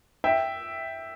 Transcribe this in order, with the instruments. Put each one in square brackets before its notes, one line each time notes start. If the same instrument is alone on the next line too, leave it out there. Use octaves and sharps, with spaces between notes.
[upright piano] E5 G5